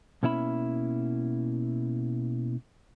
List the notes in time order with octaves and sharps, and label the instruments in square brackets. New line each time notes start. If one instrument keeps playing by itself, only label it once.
[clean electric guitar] B2 A#3 C#4 E4 E5 B5